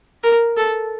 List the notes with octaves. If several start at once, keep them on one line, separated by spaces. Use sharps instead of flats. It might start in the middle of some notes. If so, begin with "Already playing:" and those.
A#4
A4